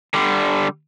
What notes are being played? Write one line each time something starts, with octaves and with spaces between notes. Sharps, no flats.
D3 G3